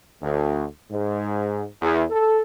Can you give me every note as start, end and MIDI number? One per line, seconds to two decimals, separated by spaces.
0.22 0.64 38
0.91 1.64 44
1.81 2.04 40
2.10 2.42 69